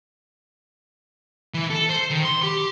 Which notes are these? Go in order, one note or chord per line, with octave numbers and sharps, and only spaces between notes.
E3
A4
C5
D#3
C6
G4